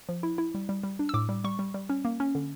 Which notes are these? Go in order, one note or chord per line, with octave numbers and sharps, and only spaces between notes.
F3
E4
E4
G3
G3
G3
D4
E6
A2 D6
G3
G3 C#6
G3
G3
C#4
A#3
C#4
D3